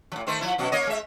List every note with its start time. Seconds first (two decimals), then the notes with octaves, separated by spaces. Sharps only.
0.12 A2 F3
0.27 D#3 A3 C5
0.41 F3 E4
0.58 F#2 B2 F#4
0.72 A#3 C#5 D#5
0.87 G#3 E5